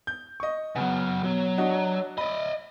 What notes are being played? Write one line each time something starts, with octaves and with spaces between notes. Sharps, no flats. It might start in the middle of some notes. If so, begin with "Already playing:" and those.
G6
D#5 C#6
C#3 F#3 B3
B2 F#3
D4 F#4 D#5
D5 D#5 B5